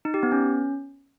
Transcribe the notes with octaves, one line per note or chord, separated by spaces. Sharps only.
D#4
G4
B3
C#4